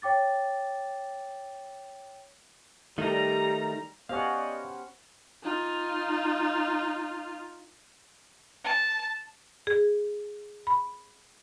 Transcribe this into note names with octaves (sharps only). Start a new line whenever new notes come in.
C#5 G5 D6 A6
D#3 G3 A3 D#4 A#5
B3 C#4 G4 C5 D5 D#5 F5 F#5
D#4 F4
A5
G#4
B5